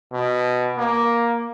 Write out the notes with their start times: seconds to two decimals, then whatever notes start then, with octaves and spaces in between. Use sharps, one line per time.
0.13 B2
0.78 A#3